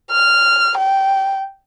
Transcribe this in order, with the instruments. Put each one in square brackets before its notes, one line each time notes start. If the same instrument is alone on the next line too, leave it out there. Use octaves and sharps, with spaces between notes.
[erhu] F6
G5